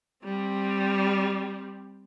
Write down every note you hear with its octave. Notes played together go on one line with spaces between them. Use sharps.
G3 C4